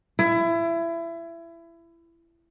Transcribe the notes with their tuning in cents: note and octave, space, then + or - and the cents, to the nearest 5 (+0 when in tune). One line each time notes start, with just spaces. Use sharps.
E4 +25